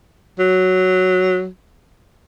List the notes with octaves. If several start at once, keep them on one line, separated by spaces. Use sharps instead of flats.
F#3